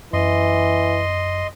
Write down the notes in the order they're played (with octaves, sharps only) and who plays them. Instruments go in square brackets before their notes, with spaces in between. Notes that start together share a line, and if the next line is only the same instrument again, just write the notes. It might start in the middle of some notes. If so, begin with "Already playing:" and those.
[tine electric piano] F#2 [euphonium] E3 [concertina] D#5 C6